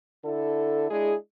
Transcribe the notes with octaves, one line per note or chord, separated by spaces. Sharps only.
D3 E4 A4
G#3 D4 E4 G#4